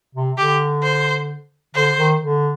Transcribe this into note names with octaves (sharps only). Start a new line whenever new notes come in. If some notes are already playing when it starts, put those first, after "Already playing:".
C3
D3 G4
C5
D3 C5
D#3
D3